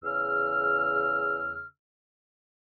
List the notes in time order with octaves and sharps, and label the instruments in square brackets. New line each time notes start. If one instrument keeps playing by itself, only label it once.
[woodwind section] E2 C#3 E6 F6